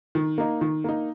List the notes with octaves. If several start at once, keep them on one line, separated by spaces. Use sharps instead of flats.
D#3
A#3 D#4
D#3
A#3 D#4